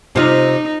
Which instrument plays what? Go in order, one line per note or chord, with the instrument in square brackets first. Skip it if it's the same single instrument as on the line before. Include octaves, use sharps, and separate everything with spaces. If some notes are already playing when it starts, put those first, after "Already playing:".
[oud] C3 F4 [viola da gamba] D#4